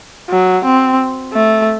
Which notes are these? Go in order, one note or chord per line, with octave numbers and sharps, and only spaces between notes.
F#3
C4
A3